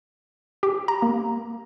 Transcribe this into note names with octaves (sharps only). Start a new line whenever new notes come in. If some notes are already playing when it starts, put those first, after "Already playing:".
G4
A#5
A#3